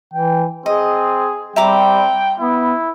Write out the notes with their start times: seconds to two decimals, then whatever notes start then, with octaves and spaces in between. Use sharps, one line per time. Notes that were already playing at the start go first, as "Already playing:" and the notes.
0.14 E3 G5
0.66 C4 G#4 D#5
1.56 G3 C4 E5 G5 A#5 D6
2.40 B3 E4